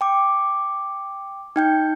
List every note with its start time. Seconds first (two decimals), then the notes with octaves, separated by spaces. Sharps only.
0.01 G5 D6
1.56 D#4 G5 G6